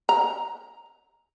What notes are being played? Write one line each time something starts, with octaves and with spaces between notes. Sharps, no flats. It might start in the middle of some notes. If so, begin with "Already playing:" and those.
A#5